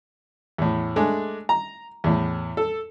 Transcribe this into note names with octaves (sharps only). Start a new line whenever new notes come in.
E2 A2
G#3 A3 D4
A#5
E2 A2
A4